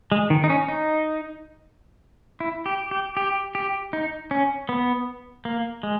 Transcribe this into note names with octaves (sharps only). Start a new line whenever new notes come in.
G#3
D#3
D#4
C#4
D#4
E4
G4
G4
G4
G4
D#4
C#4
B3
A#3
G#3